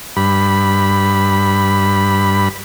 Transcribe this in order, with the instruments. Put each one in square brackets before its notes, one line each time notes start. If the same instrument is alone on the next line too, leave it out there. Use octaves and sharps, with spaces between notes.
[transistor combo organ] G2 B5